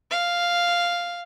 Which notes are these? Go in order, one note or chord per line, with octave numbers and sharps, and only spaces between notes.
F5